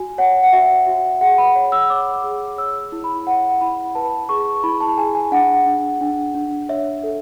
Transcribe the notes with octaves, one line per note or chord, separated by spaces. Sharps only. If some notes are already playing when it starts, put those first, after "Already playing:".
Already playing: F#4 G#5
C#5 F#5
F#5
F#4 E5
F#4
G#4 F#5
B5
C#5
E6
C#5 D6
G#4
C#5 E6
E4
B5
C#5 F#5
E4 B5
B4 A5
G#4 C#6
E4 B5
A5
G#4 G#5
G#5
D4 F#5
D4
D4
D4
C#5 E5
A4